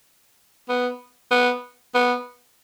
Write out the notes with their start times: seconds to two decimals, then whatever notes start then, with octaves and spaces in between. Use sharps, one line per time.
0.69 B3
1.31 B3
1.95 B3